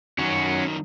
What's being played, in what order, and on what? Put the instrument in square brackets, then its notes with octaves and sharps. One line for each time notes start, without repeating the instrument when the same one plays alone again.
[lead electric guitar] F#2 D#3 [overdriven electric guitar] C#4 F#4